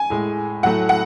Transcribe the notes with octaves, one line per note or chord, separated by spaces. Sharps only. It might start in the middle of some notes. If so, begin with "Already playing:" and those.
Already playing: G#5
A2 G#3
A2 F#3 A3 F#5
F#5